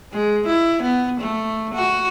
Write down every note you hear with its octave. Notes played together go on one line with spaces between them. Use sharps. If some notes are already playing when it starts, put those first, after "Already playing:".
G#3
E4
B3
A3
F#4